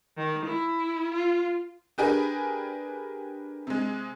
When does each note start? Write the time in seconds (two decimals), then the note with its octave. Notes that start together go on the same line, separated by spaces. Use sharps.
0.17 D#3
0.46 E4
1.14 F4
1.98 D4 G4 G#4 A#4 B4
3.67 C3 G#3